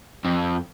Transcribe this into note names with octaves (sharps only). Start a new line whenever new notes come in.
F2